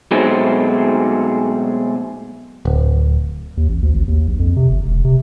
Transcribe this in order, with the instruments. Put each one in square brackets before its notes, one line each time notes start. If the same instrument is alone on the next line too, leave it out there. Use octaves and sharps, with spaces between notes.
[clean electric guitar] B2 F#3 G#3 A3 C4
[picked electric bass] D1
[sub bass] D#2
A1
D2
G#1
D#2
A#1
F2
C3
G1
E1
C3